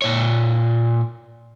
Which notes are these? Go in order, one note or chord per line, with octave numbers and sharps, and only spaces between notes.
A#2 C#5